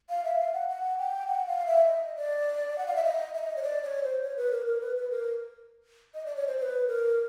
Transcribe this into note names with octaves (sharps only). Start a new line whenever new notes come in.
F5
E5
F5
F#5
F#5
G5
F#5
F5
E5
D#5
D5
F#5
F5
E5
D#5
E5
D#5
C#5
D5
D5
C#5
C5
C#5
B4
A#4
A#4
B4
B4
A#4
D#5
D5
C#5
C5
C5
B4
A#4